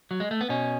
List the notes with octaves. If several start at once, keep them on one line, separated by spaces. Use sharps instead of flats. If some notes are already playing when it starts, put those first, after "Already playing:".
F#3
G#3
A3
B3
B2 C#4